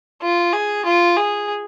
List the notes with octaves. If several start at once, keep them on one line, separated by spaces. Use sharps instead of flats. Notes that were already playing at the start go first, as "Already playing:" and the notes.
F4
G#4
F4
G#4